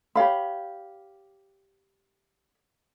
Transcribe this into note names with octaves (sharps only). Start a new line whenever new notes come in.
G4 C#5 F5 B5